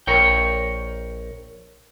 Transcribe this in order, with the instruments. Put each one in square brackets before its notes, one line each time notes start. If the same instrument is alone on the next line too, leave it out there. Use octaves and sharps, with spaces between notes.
[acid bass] A#1 [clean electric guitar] A#4 C#5 G5